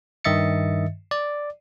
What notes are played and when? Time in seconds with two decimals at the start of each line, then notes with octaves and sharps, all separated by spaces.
0.25 G2 D#3 D#5 E5 A6 C#7
1.11 D5